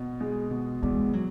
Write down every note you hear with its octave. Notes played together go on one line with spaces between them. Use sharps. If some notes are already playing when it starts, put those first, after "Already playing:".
Already playing: B2
G#3
B2
E2 G#3
F#3